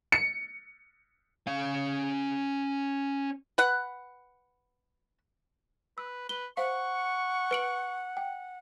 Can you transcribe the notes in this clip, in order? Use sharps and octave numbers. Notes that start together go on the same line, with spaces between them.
C#7
C#4 F5
B4 F#5
B4 E6
B4 G7
C5 F5 F#5 C#6
B4 D7 F#7
G5